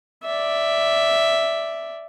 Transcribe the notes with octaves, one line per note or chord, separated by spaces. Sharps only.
D5 E5